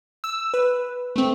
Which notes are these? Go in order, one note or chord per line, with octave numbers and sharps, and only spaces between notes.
E6
B4
A3 C4